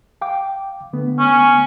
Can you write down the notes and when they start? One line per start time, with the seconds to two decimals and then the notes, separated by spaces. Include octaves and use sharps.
0.21 F5 G5 D6
0.93 D3 A3 B3
1.18 C#4